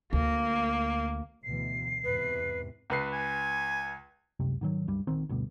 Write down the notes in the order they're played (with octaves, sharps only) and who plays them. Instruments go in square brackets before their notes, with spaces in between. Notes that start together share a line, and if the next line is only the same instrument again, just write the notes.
[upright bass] D2 [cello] A#3
[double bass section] D2 B2 E3 [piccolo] C7
[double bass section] E2 G#2 C3 [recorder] B4
[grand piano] C#2 B4 C7
[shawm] G#5
[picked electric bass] C#2 F#2 C3
G#2 D#3 F#3
C#2 G2 G3
A#1 D#3 C4
D2 G2 B2